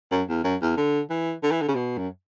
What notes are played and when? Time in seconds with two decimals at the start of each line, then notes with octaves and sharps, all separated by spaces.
0.11 F#2
0.29 E2
0.44 F#2
0.61 E2
0.77 D3
1.10 E3
1.43 D3
1.51 E3
1.62 D3
1.68 C#3
1.75 B2
1.98 F#2